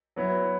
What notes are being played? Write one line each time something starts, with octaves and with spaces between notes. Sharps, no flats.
F#3 B3 E4